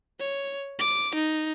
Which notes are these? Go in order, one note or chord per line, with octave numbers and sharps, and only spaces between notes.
C#5
D6
D#4